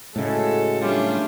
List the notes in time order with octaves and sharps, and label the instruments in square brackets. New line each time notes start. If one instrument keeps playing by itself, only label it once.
[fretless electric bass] A2 C#3 [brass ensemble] G#3 F#4 A4
[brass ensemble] F#3 C#4 F4 [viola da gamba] G3 A3 D4